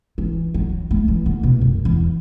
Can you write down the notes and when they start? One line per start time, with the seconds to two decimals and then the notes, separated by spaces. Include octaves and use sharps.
0.18 E3
0.54 F#3
0.91 A3
1.08 E3
1.26 D3
1.43 B2
1.61 F#2
1.85 E2